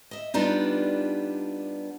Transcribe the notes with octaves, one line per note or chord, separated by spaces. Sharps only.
D#5 E5
G3 B3 D4 D#4 F4